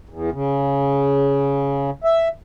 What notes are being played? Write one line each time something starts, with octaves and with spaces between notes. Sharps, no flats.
E2
C#3
E5